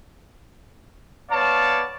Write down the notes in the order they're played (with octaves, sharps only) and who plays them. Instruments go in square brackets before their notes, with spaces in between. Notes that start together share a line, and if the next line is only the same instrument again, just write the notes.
[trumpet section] B3 C#5 D5 F5 A5